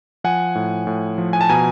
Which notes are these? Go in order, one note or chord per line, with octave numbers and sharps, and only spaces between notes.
F3 F#5 G#5
A2
A2
F3
G#5
A5
B2 G#5 A#5